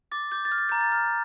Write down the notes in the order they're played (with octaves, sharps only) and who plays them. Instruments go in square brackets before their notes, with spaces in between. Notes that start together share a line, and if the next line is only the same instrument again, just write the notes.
[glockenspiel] D6 A6
D6 G6
A6
F6
A6
A#5 G6
A6
F6